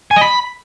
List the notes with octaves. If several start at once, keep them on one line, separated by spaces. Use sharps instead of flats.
G#5
D#5
B5